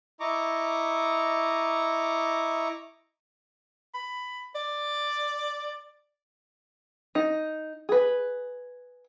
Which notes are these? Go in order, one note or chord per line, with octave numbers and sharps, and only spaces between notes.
E4 D#5 A#5 C#6 D6
B5
D5
D#4
G#4 B4